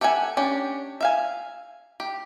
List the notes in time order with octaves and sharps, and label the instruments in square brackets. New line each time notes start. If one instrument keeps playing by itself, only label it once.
[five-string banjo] G4 A4 E5 F#5 G#5
C#4 D4 G4
E5 F5 G#5
G4